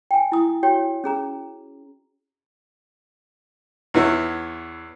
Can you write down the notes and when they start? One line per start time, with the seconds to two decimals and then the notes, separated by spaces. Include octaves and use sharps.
0.11 G5 G#5
0.32 E4 D#6
0.63 F#4 C#5 G5
1.04 C#4 G#4 A#5
3.94 E2 B3 E4 C#5